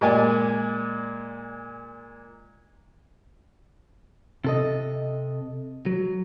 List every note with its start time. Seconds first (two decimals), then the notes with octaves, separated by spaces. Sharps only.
0.01 A#2 G#3 A#3 D5 G#5
4.44 C3 A4 D#5
5.86 F#3